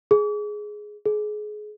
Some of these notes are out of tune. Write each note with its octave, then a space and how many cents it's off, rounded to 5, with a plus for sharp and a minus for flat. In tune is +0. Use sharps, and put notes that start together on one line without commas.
G#4 +10
G#4 +25